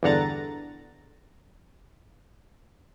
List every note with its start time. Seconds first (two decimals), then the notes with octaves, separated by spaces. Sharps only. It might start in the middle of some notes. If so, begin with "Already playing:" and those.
0.03 E2 G2 D3 F#5 A#5 A6